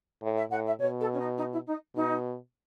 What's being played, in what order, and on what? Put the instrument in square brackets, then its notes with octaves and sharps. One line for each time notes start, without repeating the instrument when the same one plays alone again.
[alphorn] A2
[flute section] E5
[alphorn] A2 [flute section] F#5
[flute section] E5
[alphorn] B2 [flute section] C#5
[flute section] A4
C#4
D#4
D#4
E4
D#4
[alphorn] B2 [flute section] D#4